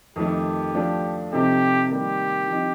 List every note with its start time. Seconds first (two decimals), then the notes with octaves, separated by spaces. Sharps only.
0.16 F2 D#3 A3 G4
0.74 F3 A3 D4 F4
1.32 C3 F3 C4 D#4 G4 A4
1.89 D#3 G3 A#3 G4
2.48 F3 C4 D#4